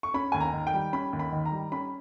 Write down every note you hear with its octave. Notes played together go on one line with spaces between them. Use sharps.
C#6
C#4 B5
D#2 G#5
A#5
D#3
G5
G3
C#4 B5
D#2
B5
D#3
A#5
G3
C#4 B5